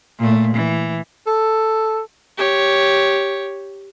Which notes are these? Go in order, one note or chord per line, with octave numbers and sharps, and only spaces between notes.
A#2 A3
E3
A4
G4 C#5